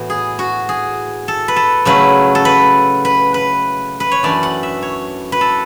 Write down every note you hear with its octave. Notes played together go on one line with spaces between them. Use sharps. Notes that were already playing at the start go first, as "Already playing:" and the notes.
Already playing: A2 E3 B3 F#4
G#4
F#4
G#4
A4
B4
A4
C#3 F#3 A3 E4 B4
A4
B4
B4
B4
B4
C#5
F#2 E3 A3 D4 D5
F#5
E5
C#5
B4
A4